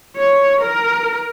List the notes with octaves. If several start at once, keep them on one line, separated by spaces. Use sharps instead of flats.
C#5
A#4